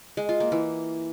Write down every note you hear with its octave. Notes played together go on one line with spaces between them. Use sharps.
G#3
F4
A#3
E3